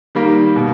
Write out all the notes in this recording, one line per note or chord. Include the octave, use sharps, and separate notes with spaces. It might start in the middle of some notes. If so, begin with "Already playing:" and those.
D#3 G3 A#3
B2